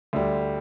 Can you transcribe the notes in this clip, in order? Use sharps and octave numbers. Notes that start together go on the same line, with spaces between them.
D2 D3 G3